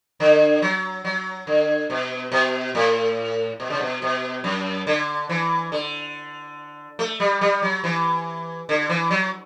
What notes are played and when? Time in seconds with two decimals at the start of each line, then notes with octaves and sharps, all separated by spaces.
0.20 D3
0.62 F#3
1.05 F#3
1.47 D3
1.90 B2
2.32 B2
2.75 A2
3.60 B2
3.70 C#3
3.80 B2
4.02 B2
4.44 F#2
4.87 D3
5.29 E3
5.72 D3
6.99 A3
7.20 G3
7.41 G3
7.62 F#3
7.84 E3
8.69 D3
8.89 E3
9.11 F#3